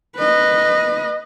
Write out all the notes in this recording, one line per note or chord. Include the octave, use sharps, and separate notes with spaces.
B4 D#5